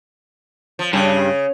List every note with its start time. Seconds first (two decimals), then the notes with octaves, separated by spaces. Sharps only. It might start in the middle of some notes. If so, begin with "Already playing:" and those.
0.79 F3
0.93 G2 C#3